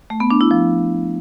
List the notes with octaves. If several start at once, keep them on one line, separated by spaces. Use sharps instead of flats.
A3
B3
D4
E4
F3